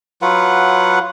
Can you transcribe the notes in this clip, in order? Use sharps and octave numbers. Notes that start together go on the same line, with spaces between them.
F#3 F4 B4 F#5